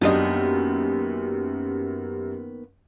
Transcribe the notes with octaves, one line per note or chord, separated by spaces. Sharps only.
F#2 D#3 A#3 B3 D4 G4 D#5